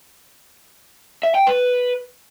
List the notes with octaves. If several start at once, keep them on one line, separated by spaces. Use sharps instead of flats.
E5
G5
B4